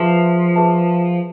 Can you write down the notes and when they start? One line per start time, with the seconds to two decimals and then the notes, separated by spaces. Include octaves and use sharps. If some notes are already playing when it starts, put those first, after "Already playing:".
Already playing: F3 F4 G#4 B4 E5 A5
0.56 F4 G#4 B4 E5 A5